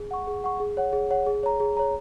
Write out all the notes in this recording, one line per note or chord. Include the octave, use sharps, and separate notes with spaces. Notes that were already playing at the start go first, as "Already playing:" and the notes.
Already playing: G#4
F#5 C#6
G#4
F#5 C#6
G#4
C#5 F#5
G#4
C#5 F#5
G#4
C#5 A#5
G#4
C#5 A#5